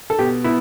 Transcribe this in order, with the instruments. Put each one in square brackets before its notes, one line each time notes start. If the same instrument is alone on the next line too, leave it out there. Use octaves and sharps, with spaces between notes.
[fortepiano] A4
[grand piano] B2 [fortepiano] G4
[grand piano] B3 [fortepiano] E4